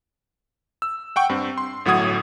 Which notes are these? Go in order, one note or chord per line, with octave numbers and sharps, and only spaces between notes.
E6
F#5 G5 C#6
G2 C4
C6
G1 A2 F#3 F#5 D#6 G#6